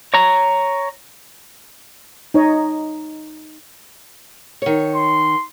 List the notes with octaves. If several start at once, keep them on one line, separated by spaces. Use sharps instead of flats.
C#5 A#5
D#4 C#5 D#5
D#3 C#5
C6